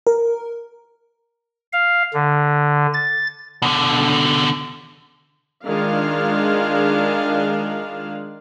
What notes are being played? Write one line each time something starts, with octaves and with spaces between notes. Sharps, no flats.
A#4
F5
D3
A6
B2 D3
D#3 G#3 D4 F4 F5